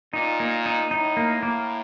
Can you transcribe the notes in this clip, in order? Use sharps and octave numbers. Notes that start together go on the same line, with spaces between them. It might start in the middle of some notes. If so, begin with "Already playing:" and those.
A#2 D#4
A#3
D#4
A2 D#4
A#3
A#3